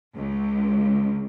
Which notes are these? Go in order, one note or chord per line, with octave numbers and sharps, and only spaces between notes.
C#2